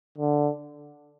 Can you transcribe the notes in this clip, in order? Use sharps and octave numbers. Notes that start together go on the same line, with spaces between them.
D3